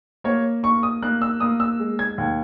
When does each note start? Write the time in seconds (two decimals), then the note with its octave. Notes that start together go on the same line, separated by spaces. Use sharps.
0.24 A#3 C#5
0.63 A#3 C#6
0.83 D#6
1.02 A#3 F#6
1.22 E6
1.40 A#3 D#6
1.60 E6
1.80 G#3
1.99 G#6
2.18 D#2